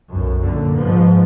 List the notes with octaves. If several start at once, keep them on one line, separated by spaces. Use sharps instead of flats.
B1 F#2
F#2 A#2 D3
G#2 F3 B3